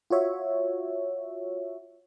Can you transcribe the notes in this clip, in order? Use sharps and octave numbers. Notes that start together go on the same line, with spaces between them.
F4 F#4 C#5 E5